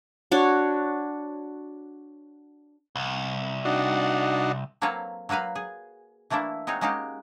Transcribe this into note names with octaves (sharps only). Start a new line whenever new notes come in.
D4 F#4 C#5
C2
D4 D#4 F#4
F#3 A#3 C4 A4 B4 C#5
F#3 A#3 F#4 B4 F5
G#4
E3 A3 A#3 D4 E4
G#3 C4 D#4 F#4 C#5
G#3 A#3 C#4 D#4 F#4 G4